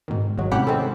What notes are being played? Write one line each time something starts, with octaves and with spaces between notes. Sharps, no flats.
G#2 B2 D#3
G#1 D#2 F#3 G#3
A2 C3 C#4 G4 F#5 B5
D#3 G#3 C4 C#4 A4